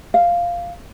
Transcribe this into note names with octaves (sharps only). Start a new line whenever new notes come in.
F5